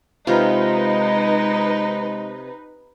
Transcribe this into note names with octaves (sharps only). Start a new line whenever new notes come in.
C3 G#3 D#4 F4 B4